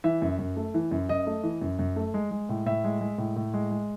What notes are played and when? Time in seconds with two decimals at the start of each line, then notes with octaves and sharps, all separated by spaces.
0.04 E3 E5
0.22 F#2
0.39 F#2
0.57 A3
0.74 E3
0.91 F#2
1.09 F#2 D#5
1.27 A3
1.43 E3
1.61 F#2
1.79 F#2
1.96 A3
2.14 G#3
2.31 G#3
2.49 A2
2.66 A2 E5
2.84 G#3
3.01 G#3
3.18 A2
3.36 A2
3.54 G#3
3.71 G#3